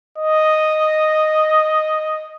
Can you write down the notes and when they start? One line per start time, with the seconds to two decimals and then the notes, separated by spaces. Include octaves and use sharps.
0.18 D#5